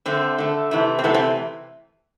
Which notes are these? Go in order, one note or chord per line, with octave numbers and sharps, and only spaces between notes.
D3 A3 C4
D3 A3
C3 E3 A3
C4
C3 E3 A3 B3
C4